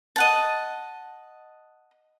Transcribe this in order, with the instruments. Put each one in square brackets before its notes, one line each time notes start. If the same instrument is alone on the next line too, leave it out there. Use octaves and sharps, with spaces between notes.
[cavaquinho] D#5 F#5 A5